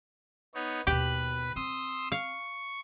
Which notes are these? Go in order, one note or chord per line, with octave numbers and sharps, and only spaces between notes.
B3 D#4 C#5
D#2 B2 G4 B4 B5 F#6
C4 C6 D#6 E6
F5 C#6